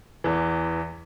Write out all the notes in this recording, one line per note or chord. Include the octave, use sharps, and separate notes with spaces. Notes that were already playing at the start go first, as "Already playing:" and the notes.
E2 E3